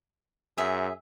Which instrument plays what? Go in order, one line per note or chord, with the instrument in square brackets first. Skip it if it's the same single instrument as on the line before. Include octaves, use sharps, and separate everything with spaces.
[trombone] F#2 [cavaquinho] G#4 E5